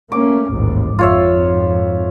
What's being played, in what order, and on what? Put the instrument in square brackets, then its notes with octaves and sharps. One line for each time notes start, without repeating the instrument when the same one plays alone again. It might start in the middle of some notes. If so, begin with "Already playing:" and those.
[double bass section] A3 A#3 C#4 [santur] D6
[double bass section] A1 D#2 G#2
[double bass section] G#1 F2 [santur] F4 C#5 E5